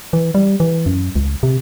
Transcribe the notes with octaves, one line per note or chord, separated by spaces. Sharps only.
E3
G3
E3
F#2
C#2
C3